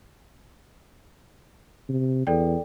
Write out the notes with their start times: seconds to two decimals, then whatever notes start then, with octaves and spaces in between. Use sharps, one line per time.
1.89 C3
2.27 E2 A4 D5 G5